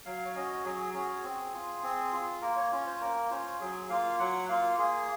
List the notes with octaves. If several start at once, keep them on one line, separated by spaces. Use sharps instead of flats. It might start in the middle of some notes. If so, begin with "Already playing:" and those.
F#3 F5
C#5
C#4 F#4 D#5
F#3 G#4
C#4 F#4 G#4
C4
F4
C4
F4
A#3 A#4
C#5
C#4 F4
C5
A#3 A#4
C#4 F4 C5
F#3 G#4
A#3 F4 F5
F#3 F#5
A#3 F4 F5
A#3 G#4